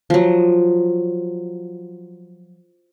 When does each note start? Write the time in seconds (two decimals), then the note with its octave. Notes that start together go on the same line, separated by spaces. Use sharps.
0.10 F3 F#3